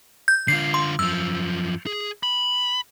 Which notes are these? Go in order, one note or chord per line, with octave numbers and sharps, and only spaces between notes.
G6
D3 F4 C7
C6
F#2 F3 E6
G#4
B5